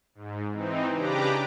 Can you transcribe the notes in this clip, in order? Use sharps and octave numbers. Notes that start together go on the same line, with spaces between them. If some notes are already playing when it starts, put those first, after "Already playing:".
G#2
E3 C4 D#4
C#3 D4 G4 B4 A#5 D6